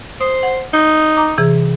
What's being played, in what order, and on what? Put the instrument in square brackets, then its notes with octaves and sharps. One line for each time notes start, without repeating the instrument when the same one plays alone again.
[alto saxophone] C5 [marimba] D#6
[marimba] F#5
[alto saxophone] D#4
[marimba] A#5 D6
C3 E3 G#4